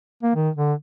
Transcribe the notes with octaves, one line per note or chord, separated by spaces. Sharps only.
A#3
D#3
D3